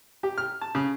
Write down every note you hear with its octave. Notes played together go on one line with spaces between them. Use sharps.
G4
F6
A5
C#3